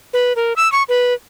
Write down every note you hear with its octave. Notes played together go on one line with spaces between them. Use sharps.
B4
A#4
E6
C#6
B4